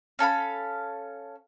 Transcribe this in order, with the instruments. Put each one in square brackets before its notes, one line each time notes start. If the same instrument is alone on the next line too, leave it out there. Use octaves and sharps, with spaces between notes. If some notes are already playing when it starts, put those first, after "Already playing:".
[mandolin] C#4 A4 F5 B5